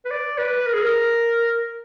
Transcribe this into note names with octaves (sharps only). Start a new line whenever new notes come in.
B4
D5
B4
A#4
G#4
A#4